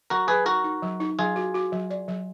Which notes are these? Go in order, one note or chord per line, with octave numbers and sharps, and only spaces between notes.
F#3 F#4 A#4
F#3 G#4 B4
D#4 F#4 A#4
D#4
F#3
D#4
F#3 F4 G#4
F#4
F#4
F#3
D5
F#3